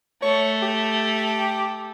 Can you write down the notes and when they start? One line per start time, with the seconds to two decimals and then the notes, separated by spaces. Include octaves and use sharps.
0.23 A3 C#5
0.63 G4